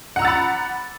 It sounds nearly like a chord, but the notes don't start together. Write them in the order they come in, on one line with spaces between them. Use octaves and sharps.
F#5 A#5 E6 A6 B5